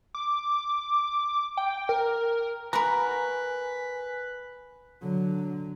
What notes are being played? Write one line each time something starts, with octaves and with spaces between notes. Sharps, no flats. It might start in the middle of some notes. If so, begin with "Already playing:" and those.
D6
G5
A#4
F#4 A#4 B4 G#5 A#5 B5
D3 F#3